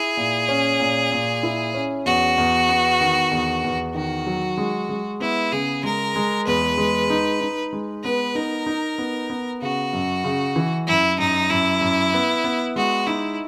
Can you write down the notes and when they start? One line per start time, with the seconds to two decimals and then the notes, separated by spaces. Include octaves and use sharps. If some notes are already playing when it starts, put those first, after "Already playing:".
Already playing: E4 G#4
0.17 A#2
0.48 C#4
0.80 A#2
1.12 A#2
1.43 E4
1.74 C#4
2.06 E2 F#4
2.38 E2
2.69 B3
3.00 D#3
3.31 E2
3.64 E2
3.95 D#3 F#4
4.27 F#3
4.57 G#3
4.89 G#3
5.20 B3 E4
5.52 C#3 G#4
5.83 G#3 A#4
6.16 G#3
6.47 E2 B4
6.78 G#3
7.10 D#4
7.41 D#4
7.73 G#3
8.04 B3 B4
8.35 D#4 A#4
8.66 D#4
8.98 B3
9.30 B3
9.62 C#3 F#4
9.93 F#2
10.24 C#3
10.56 E3
10.87 F#2 E4
11.18 F#2 D#4
11.50 F#2 E4
11.81 F#2
12.14 B3
12.44 B3
12.76 G#3 F#4
13.07 D#4 E4